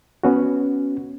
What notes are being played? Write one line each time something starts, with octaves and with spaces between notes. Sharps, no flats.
B3 C#4 F#4